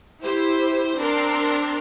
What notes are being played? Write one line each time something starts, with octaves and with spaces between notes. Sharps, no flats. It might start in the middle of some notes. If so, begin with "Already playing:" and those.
E4 G4 C5
C4 D4 A#4 C6